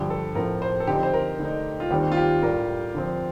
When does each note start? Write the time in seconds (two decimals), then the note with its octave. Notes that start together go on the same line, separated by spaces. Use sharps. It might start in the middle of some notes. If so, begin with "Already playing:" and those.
Already playing: G2 D3 F3 G4
0.10 A4
0.35 A2 F3 C4 F4 A#4
0.62 C5
0.80 A4
0.87 D3 F3 C4 D#4 G4
1.03 C5
1.13 A#4
1.39 D3 A3 D#4
1.80 F4
1.91 D#2 D#3 G3 C4 G4
2.12 F4
2.17 G4
2.42 A2 G3 D4 A#4
2.94 D3 F3 C4